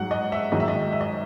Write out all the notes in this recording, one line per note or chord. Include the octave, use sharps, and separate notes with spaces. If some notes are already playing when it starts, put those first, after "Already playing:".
Already playing: G#2 F#3 F#5
D#5
E5
G#2 D#3 F#3 D#5
E5
D#5
E5
D#5